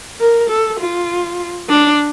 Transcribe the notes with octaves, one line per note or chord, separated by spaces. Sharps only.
A#4
A4
F4
D4